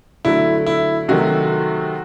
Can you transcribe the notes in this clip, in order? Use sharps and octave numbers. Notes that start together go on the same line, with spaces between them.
D3 F#3 A3 E4
E4
C3 D#3 F#3 A3 F#4